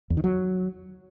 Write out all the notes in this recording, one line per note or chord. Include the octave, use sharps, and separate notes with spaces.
E2
D#3
F#3